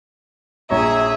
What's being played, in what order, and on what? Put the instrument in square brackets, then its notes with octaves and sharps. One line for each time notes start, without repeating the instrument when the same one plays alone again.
[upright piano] A#1 C#5 A#5 [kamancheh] G#4 E5